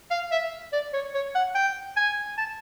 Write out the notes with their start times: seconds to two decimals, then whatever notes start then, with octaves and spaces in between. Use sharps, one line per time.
0.11 F5
0.31 E5
0.72 D5
0.94 C#5
1.14 C#5
1.35 F#5
1.55 G5
1.97 G#5
2.38 A5